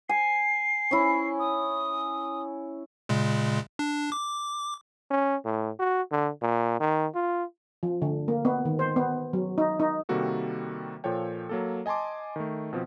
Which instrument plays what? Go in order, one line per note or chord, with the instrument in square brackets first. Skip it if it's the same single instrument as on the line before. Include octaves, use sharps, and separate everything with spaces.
[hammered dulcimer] G#5 [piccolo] C7
[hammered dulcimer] C#4 E4
[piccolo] D#6
[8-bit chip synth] A#2 C#3 G#3
D4
D6
[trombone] C#4
A2
F#4
D3
A#2
D#3
F4
[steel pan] F3
D3
A#3
B3
D#3
C5
B3
F#3
D#4
D#4
[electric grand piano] C3 D#3 G3 A#3 F#4 A4
A#2 F3 A4 C#5 G5
F#3 A#3 A4
D#5 G#5 A5 C6 D6
D#3 A3
B2 F3 C4